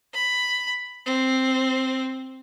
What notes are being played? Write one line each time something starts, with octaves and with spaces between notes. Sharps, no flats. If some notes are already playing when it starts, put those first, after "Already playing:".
B5
C4